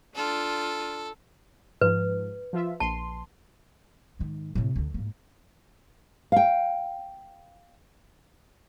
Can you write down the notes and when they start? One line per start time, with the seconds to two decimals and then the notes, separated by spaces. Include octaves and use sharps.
0.15 D4 F4 A4
1.81 G#2 F3 B4
2.53 F3 F4 E5
2.80 A#1 A5 C6
4.19 G#2 D#3
4.55 A2 C3
4.76 D2 D3
4.94 G#2 A#3
6.32 F5 G5